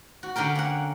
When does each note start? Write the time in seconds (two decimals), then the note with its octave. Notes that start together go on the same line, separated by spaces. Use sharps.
0.23 F#4
0.36 D3 C#4 G4 A#4
0.55 A#3 F#5